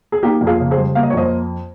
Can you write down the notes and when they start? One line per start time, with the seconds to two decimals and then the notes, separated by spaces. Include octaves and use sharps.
0.12 G#4
0.23 A#3 D#4 G4
0.41 F2
0.47 F4 G#4
0.60 C#3
0.71 G#4 C5
0.77 G3
0.95 A#3 F5
1.03 D#5
1.10 C#5
1.13 F2 C5 D#5